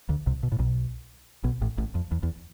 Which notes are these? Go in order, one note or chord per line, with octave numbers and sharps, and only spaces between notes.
D2 D3
C2 C3
B2
A2
B1 B2
B1 B2
A1 A2
A1 A2
F2
E2
E2